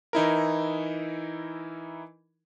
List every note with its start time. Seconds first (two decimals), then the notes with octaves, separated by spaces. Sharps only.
0.13 E3 D#4 E4 A#4